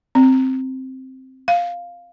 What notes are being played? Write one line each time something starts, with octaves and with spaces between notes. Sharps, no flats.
C4
F5